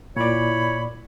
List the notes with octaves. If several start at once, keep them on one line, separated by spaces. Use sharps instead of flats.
A#2 E4 C#5 D5 B5